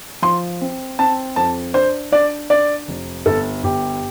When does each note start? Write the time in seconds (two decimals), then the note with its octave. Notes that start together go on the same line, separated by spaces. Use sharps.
0.22 F3 C6
0.61 C4
0.99 C4 A5
1.36 F2 A5
1.74 D4 C5
2.12 D4 D5
2.50 D4 D5
2.88 F1
3.26 G1 A4
3.64 G1 G4